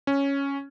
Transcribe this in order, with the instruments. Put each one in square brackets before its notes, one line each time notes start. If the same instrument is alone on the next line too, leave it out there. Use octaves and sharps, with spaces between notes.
[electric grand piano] C#4